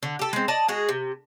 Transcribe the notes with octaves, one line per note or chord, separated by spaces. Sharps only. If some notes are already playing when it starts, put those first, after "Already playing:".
D3
G4 A4
G#3 C4
D5 D#5 A5
G#3 F#4 G#4
C3